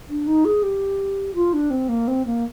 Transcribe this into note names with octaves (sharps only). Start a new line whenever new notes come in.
D4
D#4
G#4
G4
F4
D4
C4
A#3
C4
A#3